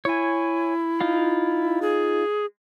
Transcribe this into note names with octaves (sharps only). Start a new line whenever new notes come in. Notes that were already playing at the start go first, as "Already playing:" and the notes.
E4 C#5 G#5
D#4 F4 F5
G#4